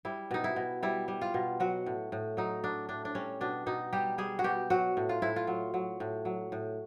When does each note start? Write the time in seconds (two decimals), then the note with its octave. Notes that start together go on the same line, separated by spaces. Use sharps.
0.05 G3 E4
0.31 B2 D#4
0.44 E4
0.56 B2
0.83 G3 E4
1.08 G3
1.21 F4
1.34 B2
1.60 F#3 F#4
1.86 A2
2.12 A2
2.37 F#3 D#4
2.64 F#3 D4
2.89 A2 D4
3.05 D4
3.15 G3 C#4
3.41 B2 D4
3.66 B2 D#4
3.93 G3 G4
4.18 G3 G#4
4.39 F#4
4.44 B2 G4
4.70 F#3 F#4
4.97 A2
5.09 F4
5.22 A2 E4
5.36 F4
5.47 F#3
5.74 F#3
6.00 A2
6.25 F#3
6.52 A2